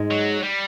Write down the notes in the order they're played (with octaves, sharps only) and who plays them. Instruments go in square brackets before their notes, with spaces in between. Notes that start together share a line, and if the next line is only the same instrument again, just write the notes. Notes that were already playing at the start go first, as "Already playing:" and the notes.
Already playing: [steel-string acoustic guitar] G#2 G#3
[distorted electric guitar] F#3
G3